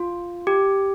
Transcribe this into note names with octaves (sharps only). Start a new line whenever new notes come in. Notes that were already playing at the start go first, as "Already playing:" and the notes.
Already playing: F4
G4